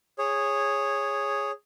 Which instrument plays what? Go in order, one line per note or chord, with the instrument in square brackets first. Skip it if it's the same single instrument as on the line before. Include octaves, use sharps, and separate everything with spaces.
[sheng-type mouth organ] G#4 C#5